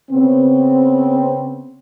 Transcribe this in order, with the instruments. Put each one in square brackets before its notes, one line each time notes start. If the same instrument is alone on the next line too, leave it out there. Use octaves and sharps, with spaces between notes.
[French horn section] C#3 B3 C4